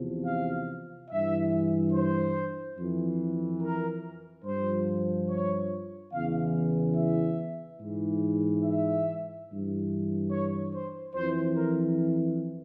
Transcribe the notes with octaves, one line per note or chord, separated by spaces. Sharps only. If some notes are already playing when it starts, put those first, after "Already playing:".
Already playing: E2 C3 F3
F5
G2 E3 E5
C5
F2 E3
A#4
G2 F3 C5
C#5
E2 C#3 E3 F5
E5
G#2 E3
E5
G2 E3
C#5
C5
F2 E3 C5
A#4